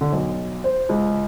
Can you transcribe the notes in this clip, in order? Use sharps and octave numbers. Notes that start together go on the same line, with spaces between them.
D3
B1
C5
C#2